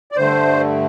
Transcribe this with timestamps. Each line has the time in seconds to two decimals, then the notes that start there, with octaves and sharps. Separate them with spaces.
0.12 D5
0.17 G2 D3 A3 C5